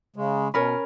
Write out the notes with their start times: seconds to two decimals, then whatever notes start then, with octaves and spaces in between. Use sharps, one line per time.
0.16 C#3 G#3
0.54 B2 C#4 A#4 B4